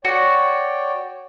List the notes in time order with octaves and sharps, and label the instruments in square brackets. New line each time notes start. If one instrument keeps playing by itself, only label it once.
[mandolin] F#4 [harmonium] C#5 D5 G5